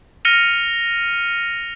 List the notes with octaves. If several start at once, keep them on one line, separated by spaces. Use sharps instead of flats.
F6 A#6 C#7 D#7 F7